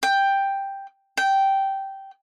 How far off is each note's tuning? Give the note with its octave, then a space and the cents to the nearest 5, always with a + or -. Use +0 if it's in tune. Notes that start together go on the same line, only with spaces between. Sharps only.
G5 +5
G5 -10